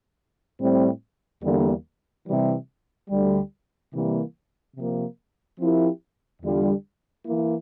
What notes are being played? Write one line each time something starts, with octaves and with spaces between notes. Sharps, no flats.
A2 G3 C4
E2 D3 G3 A#3
C3 E3 G3
D2 D3 G3
C3 E3 G3 A#3
C3 F3 A#3
F3 C4 E4 G4 A#4
E2 D3 G3 D4 F4
E3 A#3 E4